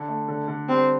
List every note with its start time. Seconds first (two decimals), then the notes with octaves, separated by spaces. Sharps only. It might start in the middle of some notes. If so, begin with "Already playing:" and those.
Already playing: D3
0.08 A3
0.28 D3
0.48 D3
0.69 G3 C4